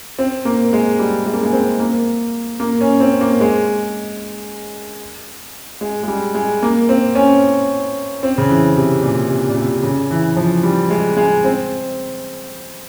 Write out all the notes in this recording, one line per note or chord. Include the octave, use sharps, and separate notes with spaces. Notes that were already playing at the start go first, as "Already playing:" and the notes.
C4
A#3
G#3
G3
G#3
A#3
G#3
C4
A#3
A#3
C#4
C4
A#3
G#3
G#3
G#3
G3
G#3
A#3
C4
C#4
C4
C#3
E3
C3
A#2
C3
A#2
C3
C#3
E3
F3
G3
G#3
G#3
C4